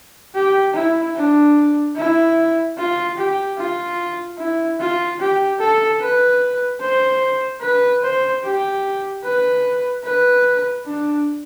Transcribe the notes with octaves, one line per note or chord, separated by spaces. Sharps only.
G4
E4
D4
E4
F4
G4
F4
E4
F4
G4
A4
B4
C5
B4
C5
G4
B4
B4
D4